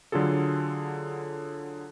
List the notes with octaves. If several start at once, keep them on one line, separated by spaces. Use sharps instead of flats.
D3 F#3 F4 G#4 A4